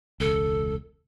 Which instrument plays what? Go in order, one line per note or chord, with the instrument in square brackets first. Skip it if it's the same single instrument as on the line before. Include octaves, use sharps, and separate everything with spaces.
[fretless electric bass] E1 C#2 [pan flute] A4